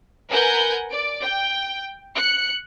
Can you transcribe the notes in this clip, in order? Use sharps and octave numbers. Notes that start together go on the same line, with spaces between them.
A#4 B4 F#5 G#5 G6
D5 D7
G5
F#6 C#7